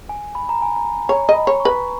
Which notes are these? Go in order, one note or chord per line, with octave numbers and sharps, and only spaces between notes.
G#5
B5
A#5
G#5
A#5
C#5 A#5
D#5
B5
C#5
C#6
B4